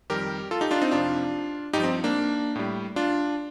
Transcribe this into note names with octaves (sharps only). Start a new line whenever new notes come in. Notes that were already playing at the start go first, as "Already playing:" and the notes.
F2 D#3 G3 G4 A#4
F4 A4
D#4 G4
D4 F4
C4 D#4
F2 C3 F3 D4 F4
G2 F3 D#4 G4
C4
A#3 D4
A2 G3
D4 F4